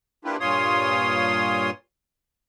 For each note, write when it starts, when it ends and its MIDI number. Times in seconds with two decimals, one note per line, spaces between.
0.24 0.36 58
0.24 0.36 62
0.24 0.36 64
0.24 0.36 65
0.24 0.36 67
0.24 0.36 71
0.40 1.70 43
0.40 1.70 46
0.40 1.70 65
0.40 1.70 73
0.40 1.70 84
0.40 1.70 87